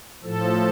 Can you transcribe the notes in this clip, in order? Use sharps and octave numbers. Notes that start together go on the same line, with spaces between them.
A2 F3 A4